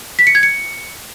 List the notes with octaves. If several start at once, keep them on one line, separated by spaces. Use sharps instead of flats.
B6
C#7
G#6
C#7